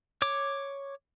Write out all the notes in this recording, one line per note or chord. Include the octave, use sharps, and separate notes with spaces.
C#5 D6